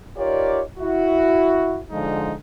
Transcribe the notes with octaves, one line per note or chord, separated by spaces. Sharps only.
D#4 F4 G4 A#4 C#5 D5
E4 F#4
D3 F3 G#3 D#4